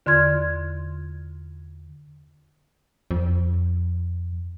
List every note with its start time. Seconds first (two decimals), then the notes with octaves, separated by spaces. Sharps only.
0.06 E2 D3 F4 C6 F6 G#6
3.11 F2